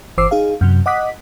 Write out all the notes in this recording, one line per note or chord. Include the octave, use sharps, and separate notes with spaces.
G1 E3 C5 D6 E6 C7
D#4 G#4 F5
F#2 C3 F#3
D#5 F#5 D6 D#6 F#6 B6